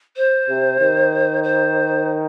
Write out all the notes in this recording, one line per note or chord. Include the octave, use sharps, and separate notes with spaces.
C5
C3
D#3
C5